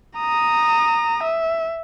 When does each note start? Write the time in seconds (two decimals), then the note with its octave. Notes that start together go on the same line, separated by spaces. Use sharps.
0.18 A#5 D#6
1.23 E5